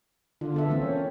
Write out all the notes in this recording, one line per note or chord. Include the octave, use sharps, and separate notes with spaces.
D3 F4
B3 A4 E5
E3 A#3 C4
C#4